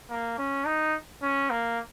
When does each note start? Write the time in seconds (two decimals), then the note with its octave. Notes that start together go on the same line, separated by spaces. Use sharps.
0.10 A#3
0.38 C#4
0.66 D#4
1.23 C#4
1.50 A#3